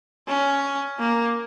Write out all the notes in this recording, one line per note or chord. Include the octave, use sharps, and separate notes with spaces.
C#4
A#3